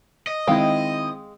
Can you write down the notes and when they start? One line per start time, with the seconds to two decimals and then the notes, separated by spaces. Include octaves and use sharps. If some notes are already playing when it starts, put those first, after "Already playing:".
0.27 D#5
0.47 D#3 G#3 C4 E4 F5 G5